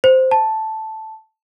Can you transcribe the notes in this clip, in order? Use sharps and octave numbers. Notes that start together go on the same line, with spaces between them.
C5
A5